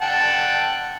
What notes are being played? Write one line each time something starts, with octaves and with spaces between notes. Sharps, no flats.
F#5 G5 A5